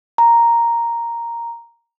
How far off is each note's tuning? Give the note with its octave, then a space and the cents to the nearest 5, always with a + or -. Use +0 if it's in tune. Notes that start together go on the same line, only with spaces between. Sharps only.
A#5 +0